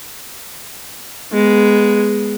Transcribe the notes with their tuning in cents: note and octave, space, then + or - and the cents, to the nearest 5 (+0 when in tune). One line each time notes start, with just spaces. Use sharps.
G#3 +0 B3 +0